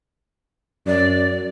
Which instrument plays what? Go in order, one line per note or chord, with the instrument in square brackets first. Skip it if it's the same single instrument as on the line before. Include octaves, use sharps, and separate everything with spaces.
[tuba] F#2 [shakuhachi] D5